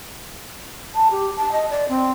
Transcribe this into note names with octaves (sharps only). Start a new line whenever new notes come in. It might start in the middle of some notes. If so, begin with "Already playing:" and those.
A5
G4
A5
D#5
D5
C4